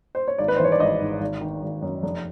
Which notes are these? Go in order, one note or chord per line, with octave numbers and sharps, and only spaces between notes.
C5
C#5
G#1 D5
B4
C5
E3 C#5
D5
G#1 D#5
G#2
G#1
D#3
G#1
F#2
F1